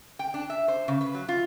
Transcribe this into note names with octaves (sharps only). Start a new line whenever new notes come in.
G5
D4
E5
C5
C#3
B4
F#3
F4